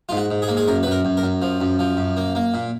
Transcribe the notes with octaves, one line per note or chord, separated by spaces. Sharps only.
G#2 F4
F#4
G#2
G#4
A#3
G#4
F#2 A#4
F#2 B4
A#4
F#2
A#4
F#2
F3
F#2
F3
F#2
A#3
A#3
A#2